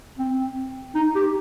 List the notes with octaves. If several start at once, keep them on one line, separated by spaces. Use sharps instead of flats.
C4
D#4
G4